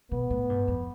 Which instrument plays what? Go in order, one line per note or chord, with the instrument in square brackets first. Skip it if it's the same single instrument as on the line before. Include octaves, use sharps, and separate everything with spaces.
[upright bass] B2 [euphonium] B3
[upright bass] A2
G2
F2